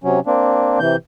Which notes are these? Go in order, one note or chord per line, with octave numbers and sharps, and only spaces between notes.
C3 F#3 C#4
A#3 C4 D4
C3 E3 G6